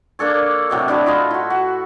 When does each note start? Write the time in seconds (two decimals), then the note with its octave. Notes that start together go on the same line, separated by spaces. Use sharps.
0.19 A#3 D4 A4 C#5
0.70 A2 C3 F#3 D#5
0.88 D4 E4 F#4 A4
1.06 E4 F4 D#5
1.31 E4 F#4
1.50 F#4